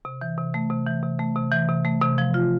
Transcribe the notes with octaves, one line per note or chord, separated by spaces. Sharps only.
C3
E3
C3
A3
C3
E3
C3
A3
C3
E3
C3
A3
C3
F3
F4